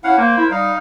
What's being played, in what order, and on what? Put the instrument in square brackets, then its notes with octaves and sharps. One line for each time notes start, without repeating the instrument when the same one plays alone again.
[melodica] C#4 F5 F#5 [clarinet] E4
[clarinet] A#3 [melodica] A#4 C5
[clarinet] E4
[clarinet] G3 [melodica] D#4 F5